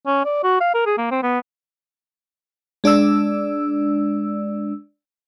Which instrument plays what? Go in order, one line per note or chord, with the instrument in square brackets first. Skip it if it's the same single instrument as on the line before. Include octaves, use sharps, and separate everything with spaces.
[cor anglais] C#4
D5
F#4
F5
A#4
G#4
A#3
C4
B3
[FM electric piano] G#3 D4 D5 E6